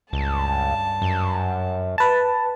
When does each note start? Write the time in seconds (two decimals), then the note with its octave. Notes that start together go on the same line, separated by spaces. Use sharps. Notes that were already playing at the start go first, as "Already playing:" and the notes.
0.13 C#2 G2 A5
1.02 F#2
1.98 B4 A5